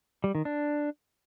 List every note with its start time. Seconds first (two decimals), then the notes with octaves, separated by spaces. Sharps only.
0.24 G3
0.35 D#3
0.45 D4